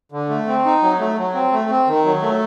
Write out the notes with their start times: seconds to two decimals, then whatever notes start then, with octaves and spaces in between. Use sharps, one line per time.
0.12 D3
0.29 A3
0.47 C4
0.65 D#4
0.83 F#3
0.99 A3
1.18 F#3
1.34 C4
1.52 A3
1.70 C4
1.87 D#3
2.05 F#3
2.22 A3